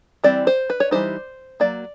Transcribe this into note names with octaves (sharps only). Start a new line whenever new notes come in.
E3 G3 C4 D5
C5
B4
C#5
E3 G3 C4 D#4 C5
F#3 A#3 D5